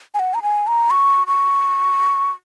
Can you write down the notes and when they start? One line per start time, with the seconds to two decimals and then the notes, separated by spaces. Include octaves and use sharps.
0.14 G#5
0.19 F#5
0.34 A#5
0.43 G#5
0.67 A#5
0.91 C#6
1.27 C#6